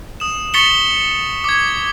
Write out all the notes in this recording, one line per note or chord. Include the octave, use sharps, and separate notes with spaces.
D#6 E7
C#6 A6 B6 C#7 F7 G7
D6 G#6